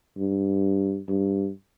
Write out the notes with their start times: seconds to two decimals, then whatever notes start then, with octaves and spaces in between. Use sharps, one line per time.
0.17 G2
1.08 G2